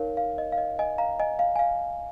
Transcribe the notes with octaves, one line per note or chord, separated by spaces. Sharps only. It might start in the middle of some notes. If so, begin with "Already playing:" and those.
Already playing: D#4 A#4 C#5 F5
F5
D#5
F5
D#5
D#5 G#5
F5 A#5
D#5 G#5
F5
G#5
F5